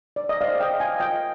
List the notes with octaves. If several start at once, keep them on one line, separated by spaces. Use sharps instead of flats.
D5
D#5
D#4 G#4 C5 D5 F5
D#5 G5
F5 G#5
F4 A#4 D#5 G5